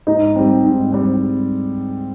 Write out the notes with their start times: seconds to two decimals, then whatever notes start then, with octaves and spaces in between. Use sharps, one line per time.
0.07 G#2 D#4
0.36 G3 C4
0.64 G#2
0.92 G3 C4